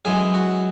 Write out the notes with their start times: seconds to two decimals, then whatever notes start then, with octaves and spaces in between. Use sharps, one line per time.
0.05 F#2 E3 G#3 G#4
0.34 F#4